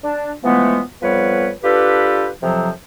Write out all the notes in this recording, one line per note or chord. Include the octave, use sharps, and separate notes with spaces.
D4
E3 F3 G#3 A3 B3
F2 F3 G3 B3 B4 C#5
D4 F4 G4 A4 B4
F2 C3 F3 F#3